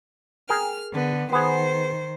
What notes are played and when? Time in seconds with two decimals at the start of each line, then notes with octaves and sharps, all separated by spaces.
0.49 G#4 A#4 G5 F6
0.93 D3 B3
1.32 D#3 B3 G#4 C5